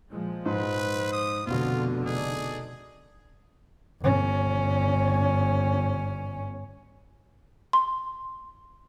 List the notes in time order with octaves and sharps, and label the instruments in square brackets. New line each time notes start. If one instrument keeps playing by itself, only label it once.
[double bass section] A#2 F3 G#3
[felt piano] G#2 [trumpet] B4 [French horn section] C5
[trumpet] D#6
[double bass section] F1 B2 D3 [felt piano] B3 F#4 [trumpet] F4
[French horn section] D#4 A4 D5 [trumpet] G#4
[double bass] G1 C#4
[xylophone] C6